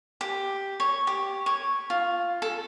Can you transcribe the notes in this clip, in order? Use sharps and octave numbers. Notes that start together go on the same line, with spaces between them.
G4
C#5
G4
C#5
F4
A4